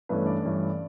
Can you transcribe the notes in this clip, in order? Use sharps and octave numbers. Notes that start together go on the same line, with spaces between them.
G2 E3 A3 B3 C#4 B4
D4 D5
G2 E3 A3 C#4